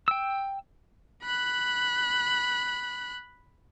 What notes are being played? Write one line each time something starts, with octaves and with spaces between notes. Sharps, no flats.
G5 E6
B5 F#6